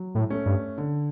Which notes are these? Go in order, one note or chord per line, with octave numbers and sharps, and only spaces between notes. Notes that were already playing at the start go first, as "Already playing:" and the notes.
Already playing: F#3
A2
A3 C#4
G2
D3